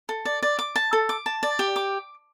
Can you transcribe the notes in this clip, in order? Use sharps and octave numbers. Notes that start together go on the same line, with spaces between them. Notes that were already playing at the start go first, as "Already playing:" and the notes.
A4
D5
D5
D6
A5
A4
D6
A5
D5
G4
D6